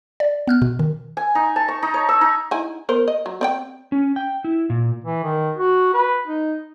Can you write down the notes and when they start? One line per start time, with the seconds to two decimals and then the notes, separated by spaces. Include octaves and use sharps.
0.20 D5
0.47 B3 F6 F#6
0.62 B2
0.79 D#3
1.17 G#5
1.35 D#4
1.56 A5
1.68 C#6
1.83 D#4
1.94 C#5
2.09 E6
2.21 D#4
2.51 D#4 E4 G#5
2.89 B3 A#4 C5
3.08 D#5
3.26 F#3
3.41 C4 D5 G5
3.92 C#4
4.16 G5
4.44 E4
4.70 A#2
5.05 E3
5.24 D#3
5.57 F#4
5.94 B4
6.27 D#4